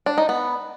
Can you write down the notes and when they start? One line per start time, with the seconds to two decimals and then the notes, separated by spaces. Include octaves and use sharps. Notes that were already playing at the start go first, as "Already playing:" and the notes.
0.06 D4
0.18 D#4
0.29 B3